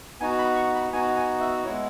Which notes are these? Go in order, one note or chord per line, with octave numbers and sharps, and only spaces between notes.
B3 D#4 F#4 G#5
B5
C#6
B5
B3 D#4 F#4 G#5
G#5
E5
G#3 B3 E4 C#5